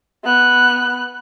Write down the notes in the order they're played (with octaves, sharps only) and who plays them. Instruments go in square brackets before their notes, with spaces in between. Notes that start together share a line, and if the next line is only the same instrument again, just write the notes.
[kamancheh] B3 F#6